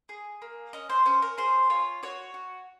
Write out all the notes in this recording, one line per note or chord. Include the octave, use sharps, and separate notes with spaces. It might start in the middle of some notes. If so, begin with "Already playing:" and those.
G#4
A#3
C#4 D#5
C5
C#4 C5
A#4
G#4 C5
F4 C#5
F#4 C#5
F#4